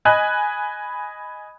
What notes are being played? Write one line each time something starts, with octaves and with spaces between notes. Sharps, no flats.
D#5 G#5 B5 F#6